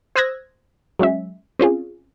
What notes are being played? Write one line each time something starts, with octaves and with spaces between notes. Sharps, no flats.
C5 D#6 E6 F#6 G#6 A#6
F#3 G#3 C#4 E5
C4 C#4 F4 G#4